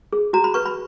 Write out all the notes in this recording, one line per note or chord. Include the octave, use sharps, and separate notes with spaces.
G#4
F#4 A#5
B5
B4 C#6
B5